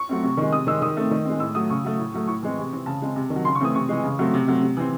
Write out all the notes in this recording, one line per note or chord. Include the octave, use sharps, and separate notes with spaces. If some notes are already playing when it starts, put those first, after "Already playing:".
Already playing: C#6
F#3 A3 C4
C3
D#3 G#3
C3 D#6
D#3 G#3 C4 E6
D#3 D#6
A3 C4
D#3
G#3 C4
A2 E6
F#3 A3 D#6
C#3 C#6
F#3 A3
A2
F#3 A3
A2 C#6
E3 G#3 C4
C3
E3 C4
C#3 A5
G#3 C4
C3
D#3
F#3
C#3 C6
C#6
E3 A3 C4 D#6
C3 C#6
E3 G#3
C#3
F#3 A3 C4
C3
F#3 A3 C4
C3
E3 C4